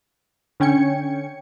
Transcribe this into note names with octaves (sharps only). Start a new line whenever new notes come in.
D3 C#4 G5 G#6 C#7